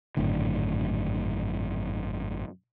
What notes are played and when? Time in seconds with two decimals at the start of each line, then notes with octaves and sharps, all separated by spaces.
0.17 G#1 F#2 A2 D3